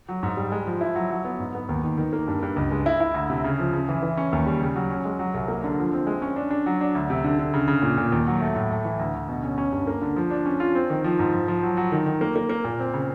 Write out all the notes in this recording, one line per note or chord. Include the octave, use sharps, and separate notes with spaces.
F#3
G#2
G3
G#3
F3
E4
F#3
F#3
B3
G#2
B3
D#2
D#3
D#3
A#3
G2
G2
C#2
G#3
E4
E4
D2
C3
C#3
F3
C#3
E3
E3
C#4
D#2
G3
C#3
F#3
C#4
G#3
F#3
C2
A#3
D3
F3
C4
G#3
C#4
D4
D4
F#3
D4
D2
C3
D3
D3
C#3
C#3
A#2
A#2
D#2
F#3
A3
A2
A3
E3
D2
D2
B2
C#4
C#4
G2
A#3
D3
F3
D4
C#4
F4
C4
D#3
F3
G#2
F3
F3
F#3
F#3
D#3
D#3
A#3
A#3
A#3
A#2
C4
C#3